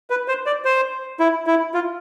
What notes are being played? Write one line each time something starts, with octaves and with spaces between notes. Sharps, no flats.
B4
C5
D5
C5
E4
E4
F4